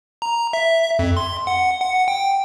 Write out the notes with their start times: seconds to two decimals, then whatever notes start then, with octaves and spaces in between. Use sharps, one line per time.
0.22 A#5
0.53 E5
0.99 F2
1.17 C6
1.47 F#5
1.81 F#5
2.08 G5